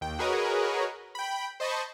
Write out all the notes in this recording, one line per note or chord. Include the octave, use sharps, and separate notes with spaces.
D#2 G5
F#4 G#4 A#4 B4 C#5 D#5
G5 B5
C5 D#5 A5 B5 C#6